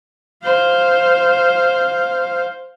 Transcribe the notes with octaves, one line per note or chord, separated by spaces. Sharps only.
C5 F5